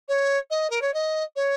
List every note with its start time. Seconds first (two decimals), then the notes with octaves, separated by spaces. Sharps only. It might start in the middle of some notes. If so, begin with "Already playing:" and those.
0.08 C#5
0.50 D#5
0.70 A#4
0.82 C#5
0.94 D#5
1.36 C#5